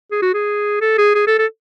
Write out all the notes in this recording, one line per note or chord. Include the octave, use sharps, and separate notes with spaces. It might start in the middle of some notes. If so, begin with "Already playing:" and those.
G#4
F#4
G#4
A4
G#4
G#4
A4
A4